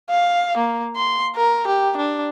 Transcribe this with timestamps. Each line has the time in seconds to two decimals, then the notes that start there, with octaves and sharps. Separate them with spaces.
0.10 F5
0.57 A#3
0.96 C6
1.36 A#4
1.67 G4
1.97 D4